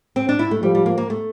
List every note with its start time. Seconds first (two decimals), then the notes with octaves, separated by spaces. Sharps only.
0.16 C4
0.29 D4
0.39 E4
0.51 A3
0.63 F3 G3
0.75 G3
0.86 A#3
0.98 A#3
1.10 A3